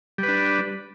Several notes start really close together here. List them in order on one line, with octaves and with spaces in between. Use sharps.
G3 B4 D4